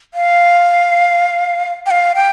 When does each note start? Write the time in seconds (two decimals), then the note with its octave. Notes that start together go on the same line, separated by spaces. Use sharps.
0.14 F5
1.86 G5
1.91 F5
2.15 G5